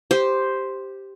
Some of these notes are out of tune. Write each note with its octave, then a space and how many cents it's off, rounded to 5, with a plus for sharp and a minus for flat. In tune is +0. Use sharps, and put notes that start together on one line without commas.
G4 +0 C5 +0